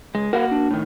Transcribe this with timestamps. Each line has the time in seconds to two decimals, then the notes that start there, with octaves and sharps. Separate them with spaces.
0.15 C#2 G#3
0.33 A#3 F#4 A#4 F5 F#5
0.52 D4
0.71 A2 D#3